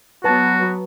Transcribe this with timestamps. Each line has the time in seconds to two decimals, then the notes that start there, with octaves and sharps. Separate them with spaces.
0.24 F#3 B3 F#4 B4 A5